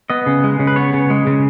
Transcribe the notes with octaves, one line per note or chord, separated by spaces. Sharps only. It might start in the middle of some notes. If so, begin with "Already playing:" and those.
B3 D#5
C#3
G#3
C#3
B4
B3 C#5
C#3
G#3
C#3